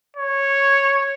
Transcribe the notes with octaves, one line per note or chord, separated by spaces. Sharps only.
C#5